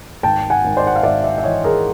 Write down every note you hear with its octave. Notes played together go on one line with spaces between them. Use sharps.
G#1 G5 A5
F#5 G#5
G#1
C5 D5
F#5
F5
G#1 D5 E5
D5 E5
E5
E3 C#5 D#5
G#4 A#4